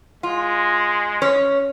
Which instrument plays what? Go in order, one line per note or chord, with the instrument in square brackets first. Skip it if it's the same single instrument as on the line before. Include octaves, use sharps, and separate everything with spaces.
[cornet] G#3 [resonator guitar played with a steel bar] F4
[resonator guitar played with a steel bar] C#4 C#5